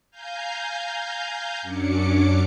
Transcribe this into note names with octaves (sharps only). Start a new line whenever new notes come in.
F5 G#5 A#5 G6
F#2 F#3 C#4 D4 D6 C#7